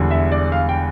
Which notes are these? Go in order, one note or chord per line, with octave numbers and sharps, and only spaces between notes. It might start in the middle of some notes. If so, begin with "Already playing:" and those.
Already playing: E1 E2 D3 G3
E5
D5
F5
G5